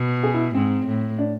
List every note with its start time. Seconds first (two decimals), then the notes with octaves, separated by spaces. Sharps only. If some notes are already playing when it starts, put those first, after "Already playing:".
Already playing: B2
0.23 G#4
0.34 E4
0.54 G#2 C4
0.86 A2
1.18 D4